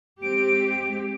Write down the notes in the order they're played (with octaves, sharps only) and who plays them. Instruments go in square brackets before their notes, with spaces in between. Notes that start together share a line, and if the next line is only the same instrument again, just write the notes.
[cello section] G#3 C4 G4 [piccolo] D7